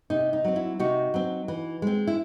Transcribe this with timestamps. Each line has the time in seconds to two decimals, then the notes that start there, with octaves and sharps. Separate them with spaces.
0.10 C3 D#4
0.33 D#4
0.44 F#3 C4
0.56 E4
0.79 C3 D#4 F#4
1.14 F#3 C4
1.48 E3
1.82 G#3 C4
2.07 E4